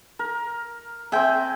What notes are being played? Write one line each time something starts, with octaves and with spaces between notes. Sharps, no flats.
A#4
C4 G#4 E5 G5